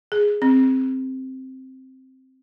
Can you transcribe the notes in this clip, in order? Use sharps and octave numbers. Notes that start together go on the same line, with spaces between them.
G#4
C4